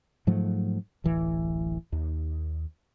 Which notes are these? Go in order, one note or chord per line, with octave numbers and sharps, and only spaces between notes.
G#2 F3 F#3 A3
D1 A1 E3
D#2